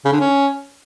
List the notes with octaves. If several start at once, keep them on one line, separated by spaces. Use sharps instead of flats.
C#3
D3
C#4